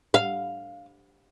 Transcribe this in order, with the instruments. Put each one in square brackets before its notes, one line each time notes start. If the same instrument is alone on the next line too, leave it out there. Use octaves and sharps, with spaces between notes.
[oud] F5